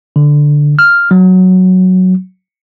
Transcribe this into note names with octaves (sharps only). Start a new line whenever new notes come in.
D3
F6
F#3